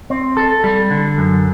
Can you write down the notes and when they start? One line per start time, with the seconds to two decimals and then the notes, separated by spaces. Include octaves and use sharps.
0.10 C4
0.37 A4
0.64 G3
0.91 D3
1.18 F#2